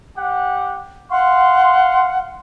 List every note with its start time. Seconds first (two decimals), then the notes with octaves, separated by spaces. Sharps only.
0.16 G4 F#5
1.11 F5 F#5 C6